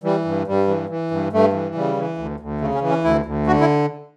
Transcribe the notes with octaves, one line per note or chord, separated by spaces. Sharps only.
E3 G3
G2
G2 G3
E3
E3
G2
G2 A3
E3
C#3 G3
E3
D2
D2
C#3 A3
C#4
E3
C#4
D2 E4
D2
D3 F#4
E4